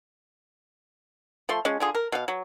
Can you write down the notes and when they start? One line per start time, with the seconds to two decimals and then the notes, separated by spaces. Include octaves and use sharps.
1.49 F3 A3 C6
1.65 G#3 C#4 F4
1.80 D3 F4 G#4
1.95 A#4
2.12 B2 B3 F5
2.28 F#3